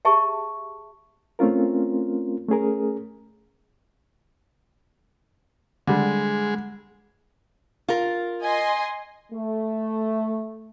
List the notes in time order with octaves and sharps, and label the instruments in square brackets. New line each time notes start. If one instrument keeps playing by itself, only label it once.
[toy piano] G4 G#4 E5 A5 C#6
[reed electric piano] A3 C4 C#4 F4 A#4
A3 C#4 G#4 A#4
[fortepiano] D3 G3 [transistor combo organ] G#3
[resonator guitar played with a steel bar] F4 A#4
[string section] D#5 G#5 C6
[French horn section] A3